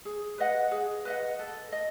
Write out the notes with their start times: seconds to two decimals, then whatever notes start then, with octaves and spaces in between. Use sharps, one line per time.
0.05 G#4
0.38 B4 D#5 F#5
0.71 G#4
1.05 B4 D#5 F#5
1.39 A4
1.72 D#5